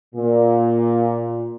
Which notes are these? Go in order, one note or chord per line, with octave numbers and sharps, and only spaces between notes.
A#2